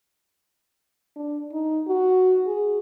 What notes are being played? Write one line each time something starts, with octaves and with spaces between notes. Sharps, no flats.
D4
D#4
F#4
G#4